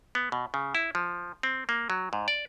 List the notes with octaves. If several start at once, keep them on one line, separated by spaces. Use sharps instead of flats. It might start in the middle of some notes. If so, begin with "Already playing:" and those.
B3
B2
C#3
E4
F3
C4
A#3
F#3
G#2
D5